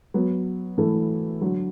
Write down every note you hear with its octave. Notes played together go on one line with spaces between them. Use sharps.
F#3 B3
E3 A3
D3 F#3